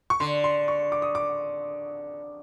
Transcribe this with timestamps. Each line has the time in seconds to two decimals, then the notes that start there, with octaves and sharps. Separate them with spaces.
0.10 C#6
0.20 D3 C6
0.44 C6
0.68 C#6
0.92 D6
1.02 D#6
1.15 D6